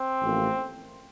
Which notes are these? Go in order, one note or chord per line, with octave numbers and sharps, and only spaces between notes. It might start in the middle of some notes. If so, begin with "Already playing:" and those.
Already playing: C4
A1 A2 F3 A#3